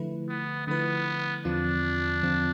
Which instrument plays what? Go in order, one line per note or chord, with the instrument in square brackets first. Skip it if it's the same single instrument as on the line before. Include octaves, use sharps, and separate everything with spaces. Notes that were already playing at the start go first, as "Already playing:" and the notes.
Already playing: [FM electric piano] D3 F3 A3 E4 B4
[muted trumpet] B3
[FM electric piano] D3 F3 A3 E4 B4 [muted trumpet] B3
[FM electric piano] E2 D3 F3 C4 F4 [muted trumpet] D4
[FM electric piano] E2 D3 F3 C4 F4